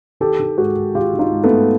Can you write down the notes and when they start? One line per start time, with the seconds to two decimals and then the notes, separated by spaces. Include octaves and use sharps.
0.20 D#3 G4 A4
0.39 D#3
0.58 G#2 F#4 G#4
0.76 G#2
0.95 D#3 F4 G4
1.14 D#3
1.19 D#4 F4
1.32 G#2
1.44 A3 B3
1.50 G#2